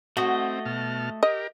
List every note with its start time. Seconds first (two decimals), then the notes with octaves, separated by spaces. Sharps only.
0.17 A3 C4 F#4 D#5
0.66 B2 A5 F6
1.23 G4 A#4 D#5